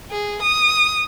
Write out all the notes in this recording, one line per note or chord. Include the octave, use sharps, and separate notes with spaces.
G#4
D#6